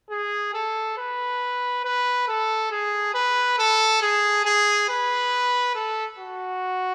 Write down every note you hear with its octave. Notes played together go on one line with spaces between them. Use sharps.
G#4
A4
B4
B4
A4
G#4
B4
A4
G#4
G#4
B4
A4
F#4